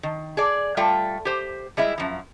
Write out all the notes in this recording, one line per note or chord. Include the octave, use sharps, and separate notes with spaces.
D#3
G#4 D5
G3 A3 F4 G5
G4 C5
G3 G#3 E4 E5
F#2 F3